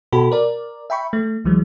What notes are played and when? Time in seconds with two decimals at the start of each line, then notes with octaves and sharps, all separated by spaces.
0.12 B2 F#4 A4 B5
0.32 A#4 D5
0.90 E5 G5 B5 C#6
1.13 A3
1.45 C2 E3 F#3 G#3